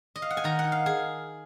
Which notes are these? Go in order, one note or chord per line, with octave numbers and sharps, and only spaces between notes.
D#5
F5
F#5
G#5
D#3 A#5
F#5
D#4
F5
G#4